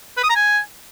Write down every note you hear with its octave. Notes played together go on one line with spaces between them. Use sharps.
B4
D#6
A#5
G#5